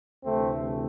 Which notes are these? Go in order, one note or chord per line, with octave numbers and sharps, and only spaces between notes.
D2 C3 E3 A3 C4